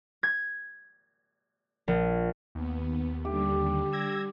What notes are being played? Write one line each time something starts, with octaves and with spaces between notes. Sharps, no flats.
G#6
A#1
D#2 B3
D3 G3 G4
E6 G#6 A#6